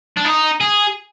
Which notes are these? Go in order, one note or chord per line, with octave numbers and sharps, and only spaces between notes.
D4
D#4
G#4